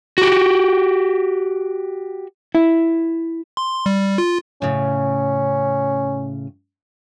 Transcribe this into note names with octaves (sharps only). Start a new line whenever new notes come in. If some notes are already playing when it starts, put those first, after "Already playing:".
F#4 G4
E4
C6
G3
F4
A2 C#3 C#4